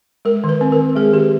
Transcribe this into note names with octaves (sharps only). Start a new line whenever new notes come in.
G#3 A#4
D#3
B4
C4
A#4
D#3
G#3 G#4
D#3 G4